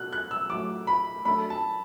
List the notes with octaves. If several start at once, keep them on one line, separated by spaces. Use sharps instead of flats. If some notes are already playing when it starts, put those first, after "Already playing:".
Already playing: B2 F#3 D4 F#4 A4 F#6
F#6
E6
A2 F#3 A3 F#4 D6
B5
F#3 A3 D4 A4 B5
A5